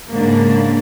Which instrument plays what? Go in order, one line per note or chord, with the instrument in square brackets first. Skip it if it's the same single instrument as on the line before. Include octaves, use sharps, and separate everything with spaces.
[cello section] G#2 C#3 D4 [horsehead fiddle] A#3